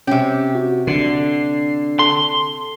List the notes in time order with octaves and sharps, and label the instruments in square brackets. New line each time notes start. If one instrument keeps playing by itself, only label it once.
[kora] C3 G4 [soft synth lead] C#4
[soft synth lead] F#4
[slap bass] D3 [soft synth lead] C7
[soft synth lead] A4 [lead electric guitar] C6